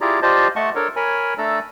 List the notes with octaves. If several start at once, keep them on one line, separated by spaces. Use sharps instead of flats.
E4 F4 G4 G#4 D5 A#5
F4 G4 C5 D5 D#5 A5
A3 D#5 F#5 A5 C#6
D4 A4 A#4 C#5
A#4 C#5 G#5 B5
A3 D4 A4 D5 A#5 E6